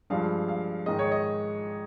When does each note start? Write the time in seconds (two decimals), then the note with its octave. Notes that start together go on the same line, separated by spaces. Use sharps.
0.10 G2 F3 G#3 F5
0.48 F5
0.86 G#2 D#3 G#3 D#5
0.99 C#5
1.12 D#5